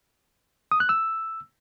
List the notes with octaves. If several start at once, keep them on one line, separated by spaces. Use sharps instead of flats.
D#6
F#6
E6